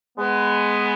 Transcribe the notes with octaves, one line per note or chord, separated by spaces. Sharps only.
G#3 B3